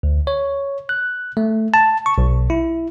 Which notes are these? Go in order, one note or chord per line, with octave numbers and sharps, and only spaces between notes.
D2
C#5
F#6
A3
A5
C#6
B1
E4